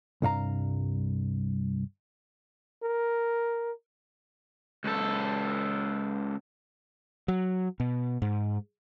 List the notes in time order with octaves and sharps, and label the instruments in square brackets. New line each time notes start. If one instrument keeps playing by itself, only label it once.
[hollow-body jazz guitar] C2 G2 F5 A#5
[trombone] A#4
[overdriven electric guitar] C#2 A4
[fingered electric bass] F#3
B2
G#2